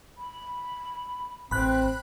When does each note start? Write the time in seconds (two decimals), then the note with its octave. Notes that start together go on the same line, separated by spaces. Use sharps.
0.17 B5
1.51 A1 C4 B5 F#6